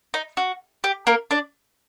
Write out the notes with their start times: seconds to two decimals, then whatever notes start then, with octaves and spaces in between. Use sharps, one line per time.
0.14 D#4
0.37 F#4
0.84 G4
1.07 A#3 A#4
1.31 D4 D5